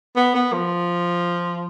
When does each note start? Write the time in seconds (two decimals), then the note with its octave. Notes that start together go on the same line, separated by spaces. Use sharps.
0.16 B3
0.35 B3
0.53 F3